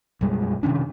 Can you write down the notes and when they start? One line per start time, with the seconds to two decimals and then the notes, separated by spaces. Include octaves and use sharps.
0.21 B1 F#2 G3 G#3
0.63 C3 D#3 C#4 D4